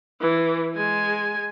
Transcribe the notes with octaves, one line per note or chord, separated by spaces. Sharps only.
E3
G#3 G#5